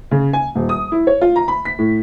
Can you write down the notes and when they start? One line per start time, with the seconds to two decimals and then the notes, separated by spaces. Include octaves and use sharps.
0.11 C#3
0.33 G#5
0.55 D#1
0.69 D#6
0.92 E4
1.07 C#5
1.21 F4
1.36 A#5
1.48 B5
1.65 B6
1.78 A2